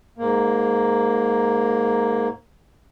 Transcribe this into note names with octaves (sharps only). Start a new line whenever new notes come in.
G#2 A#3